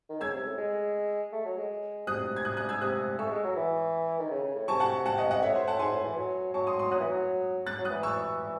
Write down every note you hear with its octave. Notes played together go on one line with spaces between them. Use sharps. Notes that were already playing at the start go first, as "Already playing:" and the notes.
D#3
C#3 E6 G#6
C3
A2
G#3
A3
F#3
G#3
C3 D#6 F#6
G#6
D#6 F#6
D#6 F#6
E6 G#6
C3 D#6 F#6
A3 C#6 E6
G#3
F#3
E3
D#3
C#3
C#3
A2
C3 A5 C#6
F#5 A5
F#5 A5
D#5 F#5
D#5 F#5
C3
A2 C#5 E5
C5
F#5 A5
G#2 G#5 C6
A2
E3
F#3
F#3 A5 C#6
C6 D#6
C6 D#6
F#3 D#6 F#6
E3
F#3
F#6 A6
F#3
D#6 F#6
E3
C#6 E6